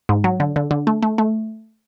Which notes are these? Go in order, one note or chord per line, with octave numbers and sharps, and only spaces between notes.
G#2
F#3
D3
D3
D3
A3
A3
A3